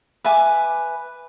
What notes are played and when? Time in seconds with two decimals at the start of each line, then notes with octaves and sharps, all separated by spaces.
0.24 B4 E5 G#5 D6